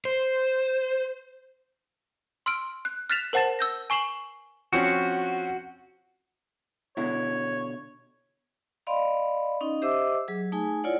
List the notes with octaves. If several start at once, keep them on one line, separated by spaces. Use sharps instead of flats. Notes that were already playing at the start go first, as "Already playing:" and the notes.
C5
C6 E6 F6 D7
F#6
F6 F#6 A6 B6 E7 F7
A#4 C5 F#5 A5 A6 E7
E6 G6 A#6
G#5 C#6 C7 E7 F#7 G7
F3 C4 C#4 F#4
B2 D3 E4 C#5
D5 D#5 F5 B5 C6
C#4 D#4 D#5
G4 C5 D#5 E5 D6 E6
F#3 G#4
A3 D#4 G#4 G#5
E4 F4 C#5 D5 F#5